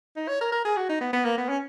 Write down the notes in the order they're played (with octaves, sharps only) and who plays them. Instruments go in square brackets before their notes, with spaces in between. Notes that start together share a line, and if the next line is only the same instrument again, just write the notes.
[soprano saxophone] D#4
C#5
A#4
A#4
G#4
F#4
D#4
B3
B3
A#3
B3
C#4